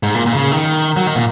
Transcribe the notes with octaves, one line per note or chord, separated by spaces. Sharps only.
G#2
A#2
A#2
C#3
D#3
F#3
D#3
A#2